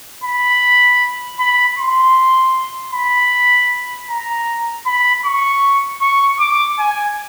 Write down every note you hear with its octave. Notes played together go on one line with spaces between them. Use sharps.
B5
B5
C6
B5
A#5
B5
C#6
C#6
D6
G#5